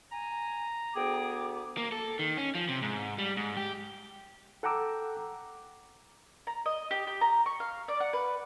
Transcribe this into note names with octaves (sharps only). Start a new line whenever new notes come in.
G#5 A#5
D2 B3 G#4 G5 D6
A#3
A4
D#3
C#4
F3
C3
G#2
G3
G#2
G4
A4 F#5 G5 A#5 D6 E6
A#5
D#5
G4
G4
A#5
C#6
F5
D5
F#5
B4